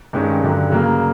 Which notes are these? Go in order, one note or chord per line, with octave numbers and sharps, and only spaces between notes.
G2 D#3 G#3 C#4
G2 D3 F#3
C#3 F#3 A#3